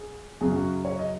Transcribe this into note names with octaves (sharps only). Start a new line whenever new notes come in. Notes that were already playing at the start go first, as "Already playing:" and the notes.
Already playing: G#4
F#2 C#3 F#3 G#4
F#4
C#5
D#5